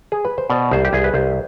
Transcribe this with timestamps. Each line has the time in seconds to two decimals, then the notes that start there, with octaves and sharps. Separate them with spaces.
0.12 G#4
0.25 B4
0.38 C5
0.50 B2 D5
0.71 C2 C5
0.85 G4
0.93 C2 G#4
1.04 B4
1.14 C2 C5